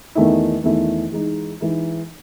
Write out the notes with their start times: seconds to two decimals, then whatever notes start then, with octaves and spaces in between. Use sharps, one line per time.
0.15 E2 D#3 A3 E4
0.64 E2 D#3 A3 E4
1.12 E3 G#3 D#4
1.60 E3 G#3 D#4